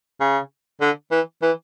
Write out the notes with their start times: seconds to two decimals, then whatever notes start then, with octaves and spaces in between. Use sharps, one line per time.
0.20 C#3
0.81 D3
1.11 E3
1.42 E3